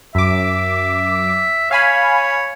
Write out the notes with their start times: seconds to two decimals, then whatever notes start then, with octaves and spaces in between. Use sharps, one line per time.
0.15 F#2 E5 D6
1.71 C#5 F5 G#5 B5